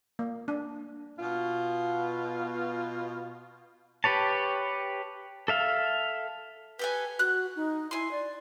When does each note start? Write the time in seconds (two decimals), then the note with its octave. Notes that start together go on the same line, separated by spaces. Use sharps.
0.19 A#3
0.48 D4
1.19 B2 F4
4.04 G4 B4 C#5 A5
5.48 A4 E5 F5
6.79 G4 A4 B4 G#5
7.19 F#4 F#6
7.56 D#4
7.91 E4 G#5 C6
8.11 D5